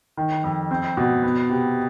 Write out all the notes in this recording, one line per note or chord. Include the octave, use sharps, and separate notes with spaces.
D#3
F2
C4
B2
B3
C3